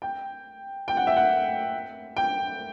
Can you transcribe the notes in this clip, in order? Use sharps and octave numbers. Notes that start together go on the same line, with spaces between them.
G5
G5
F#5
E5
F#5
G5